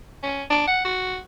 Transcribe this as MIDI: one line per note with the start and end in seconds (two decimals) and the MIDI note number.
0.23 0.43 61
0.50 0.64 62
0.67 0.82 78
0.85 1.18 66